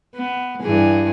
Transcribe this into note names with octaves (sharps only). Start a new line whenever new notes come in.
B3
G2 E3 G#4